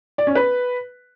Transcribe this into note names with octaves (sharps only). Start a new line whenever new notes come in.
D5
C#4
B4